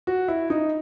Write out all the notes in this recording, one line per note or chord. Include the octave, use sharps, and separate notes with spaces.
F#4
E4
D#4